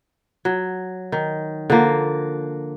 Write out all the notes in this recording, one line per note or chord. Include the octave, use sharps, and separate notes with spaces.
F#3
D#3
D3 F3 A#3